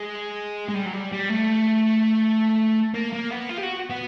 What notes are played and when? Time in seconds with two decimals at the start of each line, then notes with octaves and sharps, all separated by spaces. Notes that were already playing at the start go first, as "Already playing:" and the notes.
Already playing: G#3
0.69 G#3
0.75 G3
0.86 F#3
0.93 G3
1.12 G3
1.29 A3
2.94 A#3
3.13 A#3
3.31 B3
3.49 F4
3.58 G4
3.63 F#4
3.90 B3